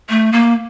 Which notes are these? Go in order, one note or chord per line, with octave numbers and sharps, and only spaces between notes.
A3
A#3